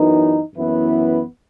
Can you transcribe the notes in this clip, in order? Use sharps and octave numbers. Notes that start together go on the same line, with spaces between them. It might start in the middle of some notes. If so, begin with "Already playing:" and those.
Already playing: F#2 E3 B3 D#4
F#2 E3 B3 E4 B4